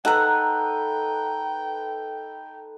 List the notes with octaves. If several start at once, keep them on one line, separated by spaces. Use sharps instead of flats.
D#4 A4 B4 F#5 G5 A#5